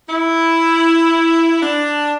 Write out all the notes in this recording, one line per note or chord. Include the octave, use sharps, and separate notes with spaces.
E4
D4